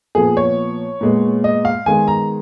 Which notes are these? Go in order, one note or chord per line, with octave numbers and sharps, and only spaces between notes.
A#2 F3 B3 G#4
C#5
A#2 G#3 B3
D#5
F5
D#3 G#3 B3 G#5
A#5